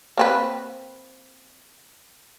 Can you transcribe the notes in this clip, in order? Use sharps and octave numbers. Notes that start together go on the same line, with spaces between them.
A#3 C4 B4